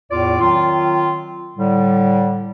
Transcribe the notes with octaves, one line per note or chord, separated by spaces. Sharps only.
E2 A2 F4 D5 D6
D#3 F#3 C4 F4
A2 D3 G3